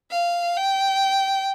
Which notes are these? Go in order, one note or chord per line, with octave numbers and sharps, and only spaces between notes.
F5
G5